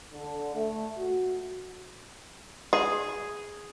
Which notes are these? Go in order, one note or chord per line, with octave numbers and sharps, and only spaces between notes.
D3
A3
F#4
G#4